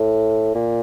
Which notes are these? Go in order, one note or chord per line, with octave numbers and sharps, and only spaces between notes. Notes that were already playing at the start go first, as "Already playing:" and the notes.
Already playing: A2
A#2